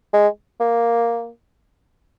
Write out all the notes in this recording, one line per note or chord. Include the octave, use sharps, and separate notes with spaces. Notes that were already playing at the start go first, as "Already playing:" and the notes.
G#3
A#3